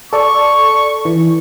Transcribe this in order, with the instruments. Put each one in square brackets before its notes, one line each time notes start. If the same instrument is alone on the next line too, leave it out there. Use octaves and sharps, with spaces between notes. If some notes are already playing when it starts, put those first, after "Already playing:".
[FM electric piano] A4 D5 [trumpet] C#6
[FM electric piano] E3